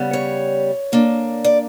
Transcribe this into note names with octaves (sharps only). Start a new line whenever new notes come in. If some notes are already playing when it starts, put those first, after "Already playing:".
Already playing: C#3 G3 B3
C#5
D3 A#3 D4
D5